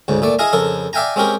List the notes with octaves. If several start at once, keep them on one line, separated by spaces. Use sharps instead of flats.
D2 G#2 C#3
A#2 A3 D5
E4 G#4 D#5 F5 G#5 A#5
F2 C#3 A4 A#4
D5 E5 F5 G5 G#5 A#5
G#3 C4 C#4 G4 A#4